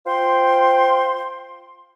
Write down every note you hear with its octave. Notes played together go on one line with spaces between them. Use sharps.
F4 C5 G5 C6